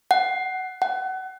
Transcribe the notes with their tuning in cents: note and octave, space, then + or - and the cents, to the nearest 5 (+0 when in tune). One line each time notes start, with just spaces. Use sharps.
F#5 +20
F#5 +30